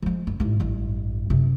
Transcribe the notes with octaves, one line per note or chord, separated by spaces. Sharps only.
F3 G#3
F#2
A1 G#2
A1 G2
F#2 C3